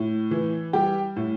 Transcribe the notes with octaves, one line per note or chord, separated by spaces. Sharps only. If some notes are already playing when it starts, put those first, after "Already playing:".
Already playing: A2
E3
G3 G4
A2